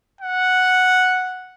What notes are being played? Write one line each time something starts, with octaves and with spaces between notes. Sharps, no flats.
F#5